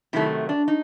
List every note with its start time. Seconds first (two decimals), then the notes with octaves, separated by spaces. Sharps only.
0.13 C3 D#3 F#3 A3 E4
0.49 D4
0.68 D#4